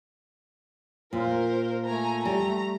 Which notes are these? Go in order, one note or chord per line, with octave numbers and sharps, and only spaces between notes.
A#2 F4 A#4 C5
A3 G#5 A#5
G3 G4 D5 A#5